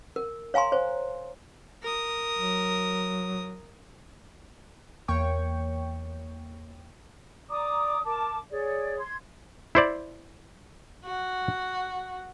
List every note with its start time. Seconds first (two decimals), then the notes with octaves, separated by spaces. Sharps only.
0.16 A#4
0.54 C#5 F5 G#5 A#5 C6
0.72 C5 C#5
1.82 A#4 D#6
2.36 F#3
5.08 E2 A#3 C#5 G5 C#6
7.50 D5 A#5 D6 D#6
8.03 A#4 A5 D6
8.50 G#4 C#5 D5
8.99 C6 G#6
9.75 E4 C5 D5
11.04 F#4